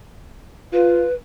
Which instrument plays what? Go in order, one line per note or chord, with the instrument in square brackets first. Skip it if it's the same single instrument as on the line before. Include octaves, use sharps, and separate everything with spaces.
[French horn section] F4 [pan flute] B4